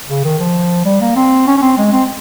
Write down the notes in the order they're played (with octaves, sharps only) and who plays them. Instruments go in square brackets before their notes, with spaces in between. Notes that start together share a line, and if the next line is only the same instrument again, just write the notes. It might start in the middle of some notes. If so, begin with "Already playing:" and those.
[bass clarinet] C#3
D#3
F3
G3
A#3
C4
C#4
C#4
C4
G#3
C4